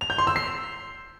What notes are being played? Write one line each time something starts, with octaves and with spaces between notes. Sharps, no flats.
F7
G6
C6
E6
C7